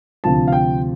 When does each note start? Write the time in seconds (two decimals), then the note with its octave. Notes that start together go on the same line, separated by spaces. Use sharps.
0.24 D2 C3 F3 A5
0.48 F5
0.53 G5